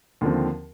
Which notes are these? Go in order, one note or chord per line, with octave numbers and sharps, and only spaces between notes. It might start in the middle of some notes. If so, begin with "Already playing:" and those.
D#2 D3 F3 C4